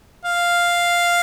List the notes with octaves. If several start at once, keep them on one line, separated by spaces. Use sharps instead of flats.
F5